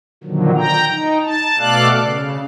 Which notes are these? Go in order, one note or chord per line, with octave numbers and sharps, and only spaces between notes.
A#2 D3 D#3 F3 F#3
G5 A#5
D#4
A5
B2 A3 A4 D5 F5 F#6
C#3